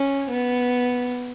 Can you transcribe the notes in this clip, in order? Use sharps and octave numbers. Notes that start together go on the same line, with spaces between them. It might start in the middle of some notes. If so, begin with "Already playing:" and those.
Already playing: C#4
B3